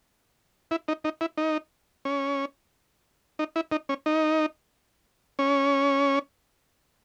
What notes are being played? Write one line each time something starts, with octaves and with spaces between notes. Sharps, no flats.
E4
D#4
D#4
E4
D#4
C#4
D#4
E4
D#4
C#4
D#4
C#4